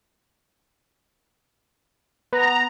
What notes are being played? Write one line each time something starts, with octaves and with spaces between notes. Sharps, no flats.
B3 A#5